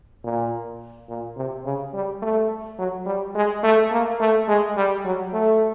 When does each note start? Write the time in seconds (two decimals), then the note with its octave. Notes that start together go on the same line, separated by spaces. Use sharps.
0.24 A#2
1.09 A#2
1.37 C3
1.65 C#3
1.94 G3
2.22 A3
2.79 F#3
3.06 G3
3.35 G#3
3.63 A3
3.92 A#3
4.20 A3
4.48 G#3
4.77 G3
5.05 F#3
5.33 A3